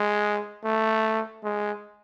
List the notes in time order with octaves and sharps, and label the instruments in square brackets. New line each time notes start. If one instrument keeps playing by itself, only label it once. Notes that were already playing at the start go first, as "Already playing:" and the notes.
Already playing: [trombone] G#3
A3
G#3